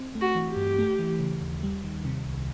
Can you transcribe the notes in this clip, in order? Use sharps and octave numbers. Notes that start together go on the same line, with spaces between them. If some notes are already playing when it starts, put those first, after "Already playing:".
Already playing: C4
A3
F#4
E3
G4
G2
A3
E3
C#3
D#2
G3
D#3
C3
C2